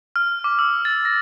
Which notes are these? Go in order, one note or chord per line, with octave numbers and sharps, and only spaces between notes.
F6
D6
E6
A6
A#6